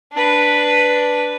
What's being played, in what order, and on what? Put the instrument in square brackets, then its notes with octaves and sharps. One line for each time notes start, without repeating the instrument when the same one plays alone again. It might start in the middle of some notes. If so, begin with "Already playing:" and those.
[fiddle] D4 B4